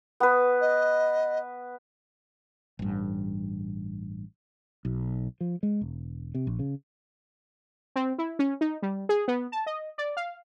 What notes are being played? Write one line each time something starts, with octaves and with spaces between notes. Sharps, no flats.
B3 B4
D#5
A1 G2
B1
F3
G#3
E1
C3
A#1
C#3
C4
E4
C#4
D#4
G3
G#4
B3
A5
D#5
D5
F5